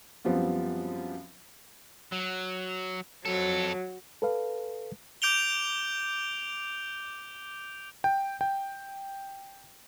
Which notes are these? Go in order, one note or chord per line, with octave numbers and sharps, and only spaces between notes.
F#2 F3 G3 B3 C4
F#3
F2 F#3 A4
A4 B4 F5
D6 G6 D7 F7 G7
G5
G5